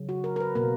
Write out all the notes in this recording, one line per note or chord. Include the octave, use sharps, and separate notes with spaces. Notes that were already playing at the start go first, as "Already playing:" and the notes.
Already playing: C#3 F#3
F#4
A#4
A#4
B4
B2 A#3 A#4